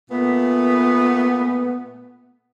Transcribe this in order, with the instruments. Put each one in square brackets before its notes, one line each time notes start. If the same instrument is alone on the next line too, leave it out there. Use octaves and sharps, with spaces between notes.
[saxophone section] A#2 A3 B3